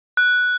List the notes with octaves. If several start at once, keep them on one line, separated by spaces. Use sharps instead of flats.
F#6